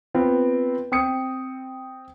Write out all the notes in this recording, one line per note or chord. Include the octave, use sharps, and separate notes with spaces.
B3 C4 F4
C4 G5 D#6 C#7